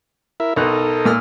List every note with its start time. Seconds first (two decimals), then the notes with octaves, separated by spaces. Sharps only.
0.40 E4 A#4 E5
0.56 B1 D#4 A4 A#4 D#5 F#6
1.05 A#2 E6 F6